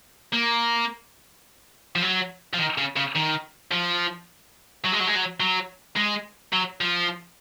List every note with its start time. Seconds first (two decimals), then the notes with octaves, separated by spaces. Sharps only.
0.33 A#3
1.96 F3
2.02 F#3
2.53 F3
2.58 D#3
2.78 C#3
2.96 C#3
3.15 D#3
3.71 F3
4.84 F#3
4.92 G#3
4.99 F#3
5.07 G#3
5.15 F#3
5.40 F#3
5.96 G#3
6.53 F#3
6.81 F3